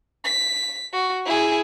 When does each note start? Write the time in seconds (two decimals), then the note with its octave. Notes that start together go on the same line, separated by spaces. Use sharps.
0.24 B6
0.93 F#4
1.26 E4 G#4